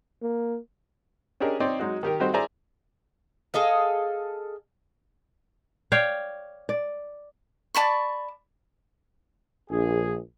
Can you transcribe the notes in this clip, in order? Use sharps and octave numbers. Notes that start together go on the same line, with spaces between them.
A#3
C#4 D4 G4 G#4 A#4 D#5
C4 D#4 C#5 D5
F#3 G#3 D#4 F#4
D#3 G4 A#4
G3 A3 C4 D#4 F#4 C5
E4 G#4 C5 D5 G#5 A#5
G#4 A4 D#5 F5
C#5 D5 F5 G5
D5
D5 A5 B5 C#6
A#1 G#4